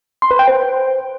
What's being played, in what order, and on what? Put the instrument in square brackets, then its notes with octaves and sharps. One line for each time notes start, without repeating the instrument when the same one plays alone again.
[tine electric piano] C6
B4
G5
C5